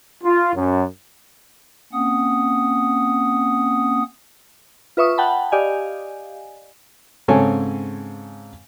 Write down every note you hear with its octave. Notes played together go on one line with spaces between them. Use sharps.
F4
F#2
A#3 C4 C#4 F#5 D#6
F4 B4 E5 C#6 D#6
F#5 G5 A5 B5
G4 D5 D#5 F5 G#5
G#2 C#3 C4 A4 C#5 G#5